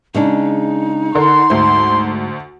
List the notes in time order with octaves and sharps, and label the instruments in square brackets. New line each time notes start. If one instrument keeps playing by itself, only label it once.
[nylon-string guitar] C#3 G#3 D4 [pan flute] D#4
[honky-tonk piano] D3 A#4 [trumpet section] C6
[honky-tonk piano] D2 C5 [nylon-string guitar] G#2